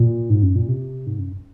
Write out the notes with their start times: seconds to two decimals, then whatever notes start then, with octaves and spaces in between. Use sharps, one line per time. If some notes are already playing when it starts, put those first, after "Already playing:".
Already playing: A#2
0.30 G#2
0.43 F#2
0.56 A#2
0.68 C3
1.07 G#2
1.19 F#2